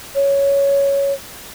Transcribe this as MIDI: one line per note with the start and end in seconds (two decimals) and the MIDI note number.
0.15 1.13 73